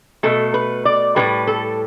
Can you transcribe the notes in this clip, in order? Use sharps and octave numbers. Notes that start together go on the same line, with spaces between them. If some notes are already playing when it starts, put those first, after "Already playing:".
B2 A3 A4
B4
D5
A2 E3 G3 B4
A4